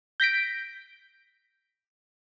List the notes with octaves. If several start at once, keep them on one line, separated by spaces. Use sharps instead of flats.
G6 A#6 B6 D7